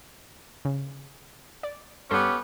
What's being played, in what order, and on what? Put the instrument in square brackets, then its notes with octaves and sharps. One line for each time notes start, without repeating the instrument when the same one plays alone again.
[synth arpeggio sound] C#3
D5
[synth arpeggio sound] G2 A4 C6 [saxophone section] B3 C#4 G4